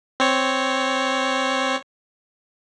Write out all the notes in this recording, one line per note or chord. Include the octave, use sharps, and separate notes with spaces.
C4 C#5